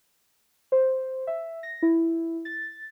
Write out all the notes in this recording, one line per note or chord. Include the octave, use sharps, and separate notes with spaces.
C5
E5
A#6
E4
A6